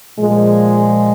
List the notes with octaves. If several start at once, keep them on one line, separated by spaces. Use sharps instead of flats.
A#2 F3 G#3